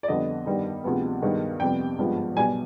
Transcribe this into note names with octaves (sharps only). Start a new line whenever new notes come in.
D5
F2 D3 G3 B3 D#5
G2 D#3 G3 B3
D2 C3 F3 G#3 B3
G2 D#3 G#3 B3
F2 C3 G3 B3 G5
G#1 G2 F3 G#3 B3
B1 B2 G3 B3 G#5